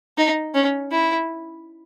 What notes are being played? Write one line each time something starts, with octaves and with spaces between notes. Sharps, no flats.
D#4
C#4
E4